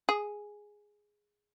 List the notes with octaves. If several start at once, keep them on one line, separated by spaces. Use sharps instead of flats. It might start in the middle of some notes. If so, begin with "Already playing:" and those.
G#4